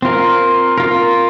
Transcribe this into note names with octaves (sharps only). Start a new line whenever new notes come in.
C4 F4 A#4
F4 A#4